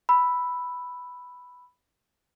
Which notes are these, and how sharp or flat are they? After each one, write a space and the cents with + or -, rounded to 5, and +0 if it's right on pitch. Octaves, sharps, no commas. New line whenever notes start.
B5 +0 E6 +0